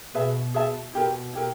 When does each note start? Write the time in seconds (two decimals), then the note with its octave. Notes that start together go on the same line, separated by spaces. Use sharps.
0.15 B2 G#4 B4 E5 A5
0.54 G#4 B4 E5 A5
0.93 B2 E4 G4 A#4
1.33 E4 G4 A#4